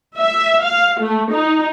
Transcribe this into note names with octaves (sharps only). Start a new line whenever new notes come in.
E5
F5
A3
D#4